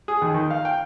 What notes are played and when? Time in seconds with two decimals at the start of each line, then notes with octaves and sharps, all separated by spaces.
0.08 G#4
0.22 D#2
0.34 D#3
0.50 F5
0.65 G5